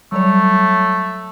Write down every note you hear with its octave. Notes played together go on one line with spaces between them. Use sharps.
F#3 G3 A3 C#5